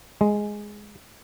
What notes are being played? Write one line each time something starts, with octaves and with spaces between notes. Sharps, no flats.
G#3